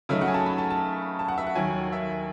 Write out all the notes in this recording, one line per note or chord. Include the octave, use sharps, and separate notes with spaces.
C#3 F#3 A3 D#4 E5
F#5
G#5
A5
B5
A5
A5
A5
F#5
E5
F#5
D#2 D#3 F#3 G#5
E5